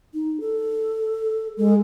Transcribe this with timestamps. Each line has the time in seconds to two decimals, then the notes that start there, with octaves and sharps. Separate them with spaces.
0.14 D#4
0.41 A4
1.58 G#3 A4